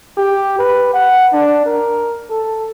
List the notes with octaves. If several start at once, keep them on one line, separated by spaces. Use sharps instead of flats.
G4
B4
F#5
D4
A#4
A4